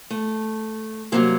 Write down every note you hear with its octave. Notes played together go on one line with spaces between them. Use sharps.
A3
C3 D#3 F#3 G3 A#3